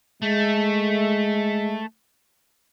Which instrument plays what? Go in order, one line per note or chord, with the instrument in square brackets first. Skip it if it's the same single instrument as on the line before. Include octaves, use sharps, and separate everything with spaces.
[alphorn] G#3 [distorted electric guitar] A3